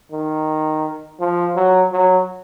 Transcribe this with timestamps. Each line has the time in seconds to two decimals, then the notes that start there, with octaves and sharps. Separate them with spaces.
0.12 D#3
1.20 F3
1.56 F#3
1.92 F#3